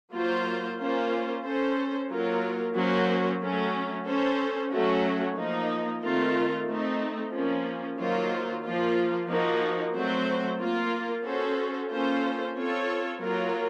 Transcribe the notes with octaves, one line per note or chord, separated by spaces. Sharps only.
F#3 A#3 F4 C5
A#3 C#4 F4 C5
C#4 A4 C5
F#3 A#3 F4 A#4
F#3 A#3 C#4 F#4 C5
F#3 A3 C#4
C#4 A4 C5
F#3 A3 C#4 F#4
F3 A#3 D#4
D#3 A3 C4 F4 A#4
A3 C4 D#4
F3 A#3 C#4
D#3 F#3 A#3 F4 C5
F3 A#3 F4
F3 A#3 D#4 F#4
F#3 A3 C4 F#4 C5
A#3 F4 A#4
C#4 F#4 A4 C5
A#3 C#4 F4 A4 C5
C4 F4 A4 C#5
F#3 A#3 F4 A#4